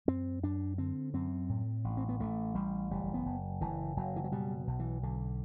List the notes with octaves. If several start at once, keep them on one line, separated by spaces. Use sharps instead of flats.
F#2 C4
F#2 D4
D3 C4
F#2 C4
A2
A1
C4
B3
A1 A3
A1 G3
F#1 G3
B3
F#1
F#1 E3
F#1 F#3
E3
F#3
B2 G3
B1
E3
B1 D3